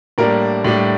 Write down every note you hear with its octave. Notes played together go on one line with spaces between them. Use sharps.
A2 G3 A#3 D4 A#4
A2 G3 D4